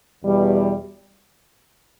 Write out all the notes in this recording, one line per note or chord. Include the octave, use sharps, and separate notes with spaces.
E2 B2 G3